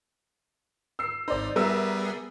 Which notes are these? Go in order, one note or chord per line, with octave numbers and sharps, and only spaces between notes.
E6 C7
G#1 D#4 C5 D5
G3 B3 G#4 A#4 E5 E6